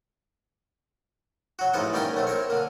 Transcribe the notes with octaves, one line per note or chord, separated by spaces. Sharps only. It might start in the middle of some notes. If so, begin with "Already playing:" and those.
F#3 F#4
A1 G#2 E3 D#4 F4 F#5
D#3 G3 A#3 C#4 A#4 G5
B1 A3 C4
C4 A#4 C#5
D3 A#3